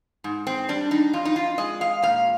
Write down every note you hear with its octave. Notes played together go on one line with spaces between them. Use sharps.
G#2
C4
G3 D4
D#4
F2 F4
D#4
F4
G#3 D#5
F5
A#2 F5